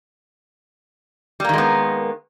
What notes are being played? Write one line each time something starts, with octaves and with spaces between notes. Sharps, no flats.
D#3 G3 G#3 A#3 B3